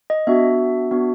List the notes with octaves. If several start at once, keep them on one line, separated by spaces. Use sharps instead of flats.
D#5
B3 D4 F#4 E5
B3 D4 F#4